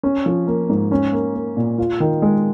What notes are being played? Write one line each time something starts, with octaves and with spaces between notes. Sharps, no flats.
C#4
F3
A#3
G#2
C#4
A#3
A#3
A#2
F4
D#3
G#3